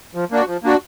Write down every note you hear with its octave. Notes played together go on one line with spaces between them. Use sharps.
F3
A#3 D4 F#4
F3
A#3 D4 F#4